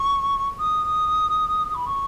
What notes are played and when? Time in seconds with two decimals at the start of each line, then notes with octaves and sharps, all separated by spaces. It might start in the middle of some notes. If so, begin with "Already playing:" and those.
Already playing: C#6
0.59 D#6
1.74 B5
1.86 C#6